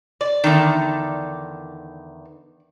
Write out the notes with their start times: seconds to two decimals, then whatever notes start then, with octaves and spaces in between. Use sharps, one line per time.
0.21 D5
0.44 E2 D3 D#3